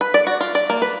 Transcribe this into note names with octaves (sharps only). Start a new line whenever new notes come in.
B4
D5
F#4
F4
D5
A#3
B4